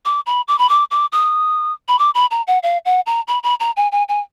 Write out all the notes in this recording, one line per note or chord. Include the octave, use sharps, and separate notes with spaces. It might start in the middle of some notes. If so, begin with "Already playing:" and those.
D6
B5
D6
B5
D6
D6
D#6
B5
D6
B5
A#5
F#5
F5
F#5
A#5
B5
B5
A#5
G#5
G#5
G#5